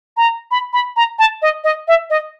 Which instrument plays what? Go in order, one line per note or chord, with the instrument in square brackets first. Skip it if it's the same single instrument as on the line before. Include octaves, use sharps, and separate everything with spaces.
[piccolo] A#5
B5
B5
A#5
A5
D#5
D#5
E5
D#5